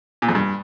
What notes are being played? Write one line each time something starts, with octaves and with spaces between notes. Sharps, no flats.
A#2
F2
G2